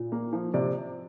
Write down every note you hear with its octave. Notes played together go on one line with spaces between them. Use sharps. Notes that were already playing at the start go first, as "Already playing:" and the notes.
Already playing: A#2
A#3
F3
C3 D5